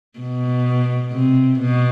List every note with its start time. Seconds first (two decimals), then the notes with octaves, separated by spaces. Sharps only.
0.19 B2
1.13 C3
1.60 B2